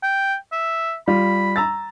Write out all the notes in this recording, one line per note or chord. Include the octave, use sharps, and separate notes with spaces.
G5
E5
G3 F4 B5
A#5 E6 A6